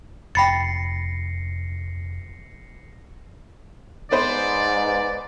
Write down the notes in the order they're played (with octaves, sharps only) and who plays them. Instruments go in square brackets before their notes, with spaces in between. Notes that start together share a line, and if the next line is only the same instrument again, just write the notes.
[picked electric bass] F1 [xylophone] G5 B5 A6 [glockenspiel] A#6 C7 C#7
[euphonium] G#2 [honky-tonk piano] B3 B4 C5 [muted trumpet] D5